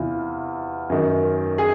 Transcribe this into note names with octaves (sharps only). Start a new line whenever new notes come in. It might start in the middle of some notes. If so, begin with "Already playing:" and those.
Already playing: E2 C3 E3 E4 F4
F#2 D#3
G#4